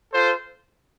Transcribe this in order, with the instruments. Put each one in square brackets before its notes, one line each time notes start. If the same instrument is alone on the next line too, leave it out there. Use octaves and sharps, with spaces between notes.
[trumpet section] F4 A4 C5